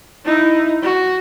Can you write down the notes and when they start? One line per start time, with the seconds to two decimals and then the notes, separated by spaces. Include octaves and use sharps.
0.25 D#4 E4
0.83 F#4